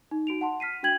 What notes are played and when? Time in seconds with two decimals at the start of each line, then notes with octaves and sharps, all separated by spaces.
0.11 D#4
0.27 D#4 F#4 D7 F7
0.41 F#5 A5 C6
0.60 F6 B6 C7 D#7
0.83 D4 F#4 G5 G#6 F#7